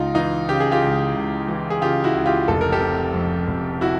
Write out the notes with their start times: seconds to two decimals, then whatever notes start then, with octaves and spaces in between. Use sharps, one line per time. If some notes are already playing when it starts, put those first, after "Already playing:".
Already playing: C#2 D#4 F4
0.15 E3 D#4 F4
0.49 C#3 G4
0.60 G#4
0.72 F4 G4
0.82 C#2
1.15 C#2
1.48 E3
1.70 G#4
1.81 C#3 F4 G4
2.04 E4 F#4
2.15 C#2
2.26 F4 G4
2.48 F1 A4
2.61 A#4
2.72 G4 A4
2.81 C3
3.14 F2
3.48 F1
3.81 E4 F#4